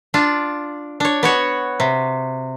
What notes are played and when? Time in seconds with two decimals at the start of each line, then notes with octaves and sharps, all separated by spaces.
0.14 D4 F4
1.00 D4 C#5
1.23 B3 F#4 C#5
1.80 C3